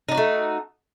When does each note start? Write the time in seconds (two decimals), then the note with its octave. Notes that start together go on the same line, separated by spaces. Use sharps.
0.09 D#4
0.11 D4
0.14 F#4
0.17 A3